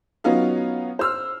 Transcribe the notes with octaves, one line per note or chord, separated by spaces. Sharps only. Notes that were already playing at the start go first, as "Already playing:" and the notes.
F#3 B3 C#4 D#4 F4 F5
C5 E6 F6